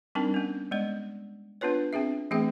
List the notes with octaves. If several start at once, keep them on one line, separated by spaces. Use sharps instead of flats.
G3 C4 D4 D#4 A#4
B3 C#4
G#3 B3 D5
B3 D4 F4 B4 C#5
C4 D4 G#4 E5
E3 A3 B3 C4 G#4 G5